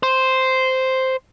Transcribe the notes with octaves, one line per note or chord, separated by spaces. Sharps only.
C5